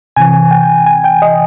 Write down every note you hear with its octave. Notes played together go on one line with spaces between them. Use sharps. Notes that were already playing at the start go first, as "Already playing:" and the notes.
C3 E3 G#5
G5
G#5
G5
D#5